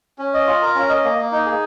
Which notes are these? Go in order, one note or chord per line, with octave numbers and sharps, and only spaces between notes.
C#4
D#5
F4
A#4
C#4
D#5
A#3
A#3
D#4
G#4